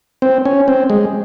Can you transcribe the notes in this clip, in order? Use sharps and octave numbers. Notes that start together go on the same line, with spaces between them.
C4
C#4
C4
G#3